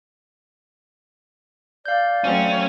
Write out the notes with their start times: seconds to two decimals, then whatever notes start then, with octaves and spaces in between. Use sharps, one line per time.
1.85 D5 F5 G6
2.24 F#3 A3 C4 C#4